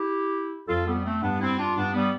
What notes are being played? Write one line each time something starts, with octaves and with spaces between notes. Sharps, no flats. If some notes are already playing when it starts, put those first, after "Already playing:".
Already playing: E4 G4
F2 F4 A4
G3 B3
A3 C4
G2 B3 D4
C4 E4
D4 F4
G2 B3 D4
G3 B3